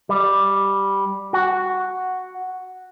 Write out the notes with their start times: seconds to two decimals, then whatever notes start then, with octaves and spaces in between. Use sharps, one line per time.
0.09 G3
1.33 F#4